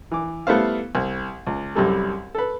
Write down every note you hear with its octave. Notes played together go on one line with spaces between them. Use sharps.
E3 D6
G3 A3 B3 E4 C5 F5
C2
C#2
C2 F#2 G3 A4
A4 B4